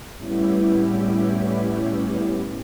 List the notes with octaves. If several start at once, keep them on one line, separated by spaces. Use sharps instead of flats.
A2 G3 B3 C#4 E4 G4